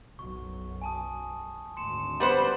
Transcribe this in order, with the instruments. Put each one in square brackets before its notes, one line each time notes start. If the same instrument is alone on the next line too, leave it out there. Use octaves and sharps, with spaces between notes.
[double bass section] B1 F#2 [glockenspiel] C#6
[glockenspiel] G#5 A5 D#6
[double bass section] G#1 D2 [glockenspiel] C6 C#7 E7
[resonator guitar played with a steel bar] G3 B3 C5